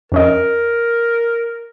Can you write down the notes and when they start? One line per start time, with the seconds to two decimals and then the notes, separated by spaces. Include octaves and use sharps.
0.12 F2 C#4 A#4 D#5